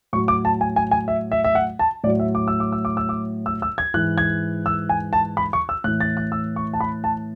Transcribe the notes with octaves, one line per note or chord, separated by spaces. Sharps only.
A2 F#3 C#6
D6
A5
G#5
G#5
G#5
E5
E5
E5
F#5
A5
A2 F#3 D5
E5
D6
E6
D6
E6
D6
E6
D6
E6
E6
G#6
G#2 E3 F#6
G#6
E6
G#5
A5
B5
C#6
E6
A2 E3 F#6
A6
F#6
E6
C#6
A5
B5
A5